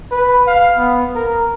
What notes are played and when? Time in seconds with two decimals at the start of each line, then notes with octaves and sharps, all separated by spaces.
0.11 B4
0.47 F5
0.77 B3
1.15 A#4